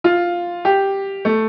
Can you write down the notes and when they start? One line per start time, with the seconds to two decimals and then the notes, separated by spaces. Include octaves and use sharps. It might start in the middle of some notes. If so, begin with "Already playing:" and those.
0.04 F4
0.65 G4
1.25 A3